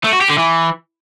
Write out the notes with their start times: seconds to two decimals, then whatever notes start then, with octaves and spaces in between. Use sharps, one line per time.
0.04 A3
0.13 F#4
0.21 G4
0.30 D3
0.38 E3